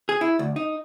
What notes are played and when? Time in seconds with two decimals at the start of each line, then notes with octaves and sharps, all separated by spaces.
0.09 G#4
0.21 E4
0.39 D2
0.56 D#4